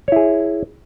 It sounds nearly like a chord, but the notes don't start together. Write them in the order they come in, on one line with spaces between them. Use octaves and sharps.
C#5 E4 G#4